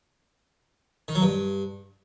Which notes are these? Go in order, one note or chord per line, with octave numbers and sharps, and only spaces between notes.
D#3
F#3
G2